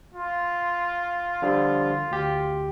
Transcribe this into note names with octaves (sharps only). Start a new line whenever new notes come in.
F4
D3 F3 G3
D2 G4